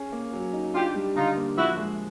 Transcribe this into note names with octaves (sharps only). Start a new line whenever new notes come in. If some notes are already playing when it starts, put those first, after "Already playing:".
Already playing: C#4 G#4
A#3
F#3
D#4
D4 F4 G4
G3
D3 D#4 F4
A#3
F3 E4 F#4
G#3